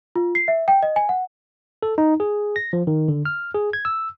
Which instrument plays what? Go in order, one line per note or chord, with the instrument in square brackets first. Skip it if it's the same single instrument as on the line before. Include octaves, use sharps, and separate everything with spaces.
[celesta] F4
C7
E5
G5
D#5
G#5
F#5
[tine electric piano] A4
D#4
G#4
A#6
F3
D#3
D3
F6
G#4
G#6
E6